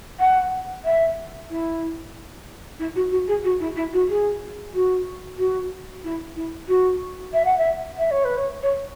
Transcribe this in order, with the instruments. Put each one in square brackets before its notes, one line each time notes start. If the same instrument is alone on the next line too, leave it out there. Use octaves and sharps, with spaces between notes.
[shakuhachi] F#5
E5
E4
E4
F#4
F#4
G#4
F#4
E4
E4
F#4
G#4
F#4
F#4
E4
E4
F#4
E5
F#5
E5
E5
C#5
B4
C#5
C#5